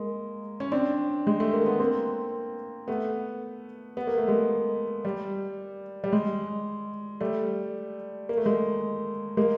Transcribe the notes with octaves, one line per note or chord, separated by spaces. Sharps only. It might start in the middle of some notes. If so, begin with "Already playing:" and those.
Already playing: G#3 A#3
C#4
C4 D4
G#3
A3
A#3
B3
A#3 C4
A3 B3
B3
A#3
A3
G#3 A#3
G3
G3
G#3
G3 A3
A#3
A3
G#3 A#3
G#3 A#3